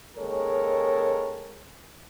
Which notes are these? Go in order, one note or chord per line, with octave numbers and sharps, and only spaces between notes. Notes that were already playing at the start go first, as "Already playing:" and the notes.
D#2 C#3 G#3 A4 A#4 C#5